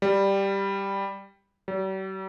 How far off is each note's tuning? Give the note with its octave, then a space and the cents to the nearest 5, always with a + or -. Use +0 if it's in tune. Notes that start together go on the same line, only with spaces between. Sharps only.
G3 +5
G3 -45